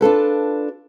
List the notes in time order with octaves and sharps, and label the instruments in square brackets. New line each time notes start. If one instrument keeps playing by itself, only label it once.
[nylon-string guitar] D4 F4 A4 B4